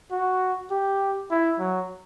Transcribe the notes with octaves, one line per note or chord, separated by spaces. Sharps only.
F#4
G4
E4
F#3